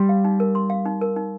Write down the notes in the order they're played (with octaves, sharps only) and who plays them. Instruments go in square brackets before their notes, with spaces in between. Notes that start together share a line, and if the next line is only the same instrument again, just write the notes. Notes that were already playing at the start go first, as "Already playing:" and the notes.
Already playing: [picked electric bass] G3 [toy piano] C6
[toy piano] F5
D#4
A#4
C6
F5
D#4
A#4
D#4